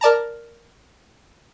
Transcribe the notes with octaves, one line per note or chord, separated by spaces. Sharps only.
A#4 D5 A5 A#5